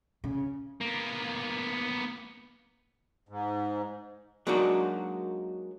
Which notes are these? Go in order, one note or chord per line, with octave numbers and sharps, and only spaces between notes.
C#3
A#3 B3
G#2
F#3 G#3 A#3 D4 D#4 F#4